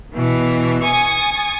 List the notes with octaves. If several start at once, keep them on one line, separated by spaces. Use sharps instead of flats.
B2 E3
G#5 C#6 D#6 A6